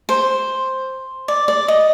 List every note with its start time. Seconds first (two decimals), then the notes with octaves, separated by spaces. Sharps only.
0.09 C5
1.28 D5
1.48 D5
1.68 D#5